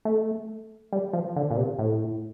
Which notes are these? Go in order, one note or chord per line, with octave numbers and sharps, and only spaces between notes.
A3
G3
F3
D3
A#2
C3
A2